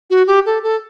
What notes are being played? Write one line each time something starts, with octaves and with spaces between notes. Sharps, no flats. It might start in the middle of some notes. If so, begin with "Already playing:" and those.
F#4
G4
A4
A4